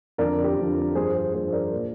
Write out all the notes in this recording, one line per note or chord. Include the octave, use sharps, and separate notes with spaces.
F2 D3 F3 A#4 D5
G4 A#4
F2 D3 F3
G2 F3 G#4 C5
G#4 C5
G2 F3 G#4 C5
A#4 D5
A#2 F3